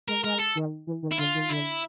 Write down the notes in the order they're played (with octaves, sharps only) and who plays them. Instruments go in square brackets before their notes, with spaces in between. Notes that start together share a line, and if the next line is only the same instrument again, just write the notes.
[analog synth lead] G#3 [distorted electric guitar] A#4
[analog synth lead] G#3 [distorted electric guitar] A#4
[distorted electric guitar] A4
[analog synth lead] D#3
E3
D#3
[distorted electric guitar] E4
[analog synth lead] D3 [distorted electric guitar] F4
[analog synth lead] D#3
[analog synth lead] D3 [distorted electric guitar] E4